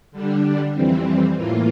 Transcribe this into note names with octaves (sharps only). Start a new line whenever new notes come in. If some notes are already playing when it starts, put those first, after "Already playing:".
D3 G3 D4
F2 E3 G3 C4
A2 E3 A#3 F4